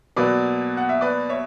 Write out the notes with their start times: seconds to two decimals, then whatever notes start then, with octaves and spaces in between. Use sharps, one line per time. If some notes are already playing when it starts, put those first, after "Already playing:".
0.16 B2 F#3 A#3 B4 D5
0.77 F#5
0.89 E5
1.01 B4 D5
1.29 C#5 E5